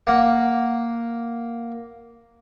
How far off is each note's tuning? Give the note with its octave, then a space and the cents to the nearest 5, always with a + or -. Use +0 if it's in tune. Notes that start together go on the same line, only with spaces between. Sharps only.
A#3 +0 F#5 +0